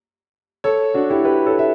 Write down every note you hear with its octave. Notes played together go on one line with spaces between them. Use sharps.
A4 C#5
D4 F#4
E4 G4
G4 B4
A4 C#5
E5